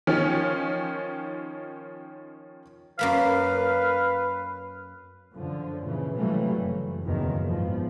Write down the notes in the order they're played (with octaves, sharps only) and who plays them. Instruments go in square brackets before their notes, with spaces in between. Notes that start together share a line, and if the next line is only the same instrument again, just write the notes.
[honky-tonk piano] D#3 F3 C#4
[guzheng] F#2 A#3 B5 [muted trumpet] B4 [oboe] F5
[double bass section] F#2 D3 F3
A#2 C#3 E3
C3 E3 F#3 G3 A3 A#3
F#1
F#1 E2 A#2 D#3 F3
G#1 E2 F3